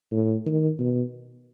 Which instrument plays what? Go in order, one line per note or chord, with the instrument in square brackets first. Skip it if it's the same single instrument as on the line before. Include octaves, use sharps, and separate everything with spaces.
[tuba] A2
D#3
B2